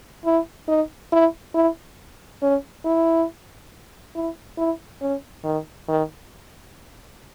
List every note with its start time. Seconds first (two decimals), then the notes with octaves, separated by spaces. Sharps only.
0.26 E4
0.68 D#4
1.12 E4
1.55 E4
2.42 C#4
2.85 E4
4.16 E4
4.58 E4
5.02 C#4
5.44 D#3
5.89 D#3